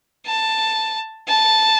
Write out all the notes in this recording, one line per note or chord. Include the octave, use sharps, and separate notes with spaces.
A5
A5